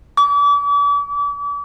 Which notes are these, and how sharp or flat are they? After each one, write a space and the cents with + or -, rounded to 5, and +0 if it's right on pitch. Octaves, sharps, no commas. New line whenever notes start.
D6 -40